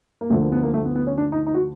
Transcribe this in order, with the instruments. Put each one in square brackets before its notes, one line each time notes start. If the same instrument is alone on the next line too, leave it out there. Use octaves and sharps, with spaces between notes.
[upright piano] A#3
D2 D3 F3 A3
A#3
B3
A#3
A3
B3
B3
C#4
D4
D#4
D#4
F#4